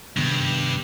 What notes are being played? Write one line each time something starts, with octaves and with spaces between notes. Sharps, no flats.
G2 C3 D#3 B3